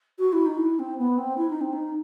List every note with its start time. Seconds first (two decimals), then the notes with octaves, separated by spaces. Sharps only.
0.19 F#4
0.33 E4
0.46 D#4
0.58 E4
0.79 C4
0.98 B3
1.18 C4
1.37 E4
1.50 D#4
1.61 C4
1.73 D#4